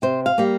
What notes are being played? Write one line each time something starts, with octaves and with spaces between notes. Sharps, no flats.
C3 C5
F5
G3 A#3